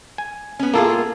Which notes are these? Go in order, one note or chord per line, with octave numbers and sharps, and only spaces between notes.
G#5
B3 C#4
A2 A#3 F4 G#4 A4